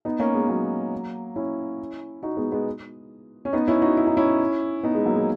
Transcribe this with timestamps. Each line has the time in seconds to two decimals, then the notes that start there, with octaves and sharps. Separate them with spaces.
0.05 B3 D#4
0.19 A#3 C#4
0.34 G#3 B3
0.48 F#3 A#3
1.36 C#4 E4
2.23 D#4 F#4
2.37 G#3 B3
2.52 G#3 B3
3.45 C#4
3.53 B3 D#4
3.68 C#4 E4
3.82 D#4 F#4
3.97 E4
4.07 D#4
4.17 C#4 E4
4.83 B3 D#4
4.95 G#3
5.05 F#3 A#3
5.16 G#3